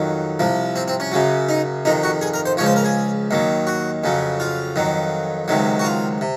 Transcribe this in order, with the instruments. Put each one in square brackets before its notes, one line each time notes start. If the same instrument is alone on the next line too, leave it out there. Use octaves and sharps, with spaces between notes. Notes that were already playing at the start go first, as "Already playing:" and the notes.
Already playing: [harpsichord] F2 D#3 F#3
C2 C3 F3
C4
C4
C#4
F#2 C#3 F#3
D#4
F2 C3 D#3 D#4
F#4
G#4
A#4
C5
C#2 C#3 F3 C#5
C5
A#4
G#4
D#2 D#3 F#3
F#4
F2 C#3 F#3
F4
F2 D#3 F#3
C#2 C3 D#3 F#3
F#4
F4
C3